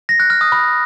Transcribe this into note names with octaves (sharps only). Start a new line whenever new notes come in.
A#6
F#6
F6
D#6
B5